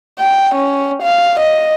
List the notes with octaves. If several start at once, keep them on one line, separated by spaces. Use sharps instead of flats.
G5
C#4
F5
D#5